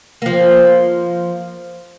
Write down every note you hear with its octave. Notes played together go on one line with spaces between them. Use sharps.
F3 A#3